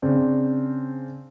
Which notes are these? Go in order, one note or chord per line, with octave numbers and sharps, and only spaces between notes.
C#3 C4 D4